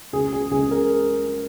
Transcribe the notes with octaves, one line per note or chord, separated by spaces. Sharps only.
C#2 G#4
G#4
C#2 G#4
A#4